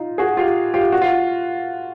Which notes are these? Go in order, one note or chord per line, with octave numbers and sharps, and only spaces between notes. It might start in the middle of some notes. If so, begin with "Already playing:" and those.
Already playing: D#4 F4
F#4 G#4
F4 G4
F4 G4
F#4
F4